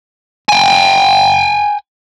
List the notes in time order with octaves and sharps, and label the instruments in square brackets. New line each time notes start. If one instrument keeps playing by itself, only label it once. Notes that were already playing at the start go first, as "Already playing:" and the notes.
[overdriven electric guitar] G5 G#5